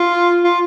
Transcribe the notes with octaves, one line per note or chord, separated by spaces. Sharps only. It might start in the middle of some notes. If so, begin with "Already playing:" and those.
Already playing: F4
F4